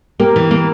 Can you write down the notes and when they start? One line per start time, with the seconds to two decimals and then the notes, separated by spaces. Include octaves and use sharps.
0.20 A#3 G4 A#4
0.36 E3
0.51 A#3